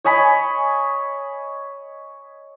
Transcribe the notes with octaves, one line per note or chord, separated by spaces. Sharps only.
C#5 D#5 G#5 B5